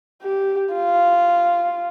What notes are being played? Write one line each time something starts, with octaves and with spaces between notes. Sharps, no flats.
G4
F4